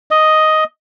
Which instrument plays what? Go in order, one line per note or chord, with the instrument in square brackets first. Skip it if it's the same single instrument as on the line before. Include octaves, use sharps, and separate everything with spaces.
[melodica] D#5